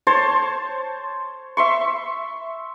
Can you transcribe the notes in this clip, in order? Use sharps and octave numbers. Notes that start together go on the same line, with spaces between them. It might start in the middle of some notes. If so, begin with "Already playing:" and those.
C5 C#5 A5 C6
E5 C6 C#6